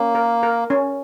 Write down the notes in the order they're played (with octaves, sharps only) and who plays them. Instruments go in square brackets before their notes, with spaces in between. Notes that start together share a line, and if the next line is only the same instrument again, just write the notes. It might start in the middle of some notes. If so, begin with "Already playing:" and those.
Already playing: [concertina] A#3 [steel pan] C#4
[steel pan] A#4
A#4
C#4